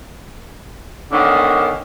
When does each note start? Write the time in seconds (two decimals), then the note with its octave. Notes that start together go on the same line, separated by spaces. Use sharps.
1.11 D3 D#3 A#3 B3 C#4 D4